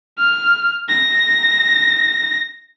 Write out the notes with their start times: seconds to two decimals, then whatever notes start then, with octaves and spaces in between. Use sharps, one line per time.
0.19 F6
0.89 A#6